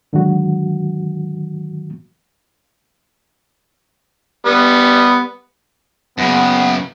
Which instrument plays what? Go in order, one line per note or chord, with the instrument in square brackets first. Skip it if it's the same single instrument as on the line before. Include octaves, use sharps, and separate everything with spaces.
[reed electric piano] G#2 D3 D#3 F#3 F#4
[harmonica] G3 B3
[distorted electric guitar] F#2 C#3 [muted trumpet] B3